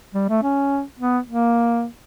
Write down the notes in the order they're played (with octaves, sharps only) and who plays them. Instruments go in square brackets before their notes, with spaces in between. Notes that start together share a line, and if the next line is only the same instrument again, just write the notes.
[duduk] G3
A3
C#4
B3
A#3